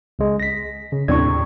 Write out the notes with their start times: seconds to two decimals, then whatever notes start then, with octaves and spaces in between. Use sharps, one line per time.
0.19 C#2 G#3
0.40 A#6 B6
0.92 C#3
1.08 D#2 A2 C3 D4 C#6 G#6